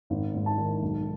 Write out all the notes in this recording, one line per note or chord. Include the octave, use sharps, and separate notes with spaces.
G#1
G#2
A5
D#3
B1